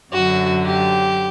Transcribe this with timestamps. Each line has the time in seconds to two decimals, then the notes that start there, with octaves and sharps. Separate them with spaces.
0.13 F#2 D3 F#4
0.65 G4